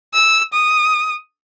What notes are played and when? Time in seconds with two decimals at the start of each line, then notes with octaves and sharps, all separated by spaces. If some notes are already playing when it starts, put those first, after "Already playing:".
0.13 E6
0.53 D#6